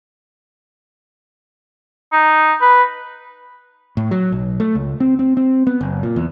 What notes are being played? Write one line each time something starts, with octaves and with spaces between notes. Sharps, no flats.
D#4
B4
A2
F#3
B1
A3
C#2
C4
C4
C4
B3
F#1
A#2
E2